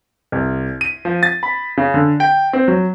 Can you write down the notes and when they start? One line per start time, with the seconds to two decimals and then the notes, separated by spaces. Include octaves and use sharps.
0.32 C2
0.81 D#7
1.05 F3
1.23 A6
1.43 B5
1.77 C#3
1.94 D3
2.20 G5
2.53 C4
2.68 F#3